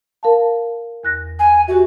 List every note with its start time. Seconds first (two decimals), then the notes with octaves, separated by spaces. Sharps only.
0.23 A#4 F5 A5
1.03 E2 F#6 A#6
1.39 G#5
1.68 F#4 G4 E5